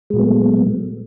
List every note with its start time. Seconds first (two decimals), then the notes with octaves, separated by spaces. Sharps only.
0.10 G#3
0.13 A#2
0.16 F#3
0.19 B3
0.22 A3